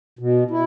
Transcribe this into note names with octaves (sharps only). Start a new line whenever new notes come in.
B2
E4